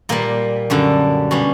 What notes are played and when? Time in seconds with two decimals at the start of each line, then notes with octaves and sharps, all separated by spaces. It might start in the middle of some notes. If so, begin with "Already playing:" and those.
0.09 A#2 G3 A#3
0.70 F#2 D3 G3
1.31 B2 G3 C#4